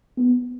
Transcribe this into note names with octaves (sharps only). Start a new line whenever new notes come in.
B3